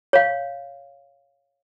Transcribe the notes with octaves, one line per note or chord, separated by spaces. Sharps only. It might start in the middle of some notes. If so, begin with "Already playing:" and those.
C#5 F5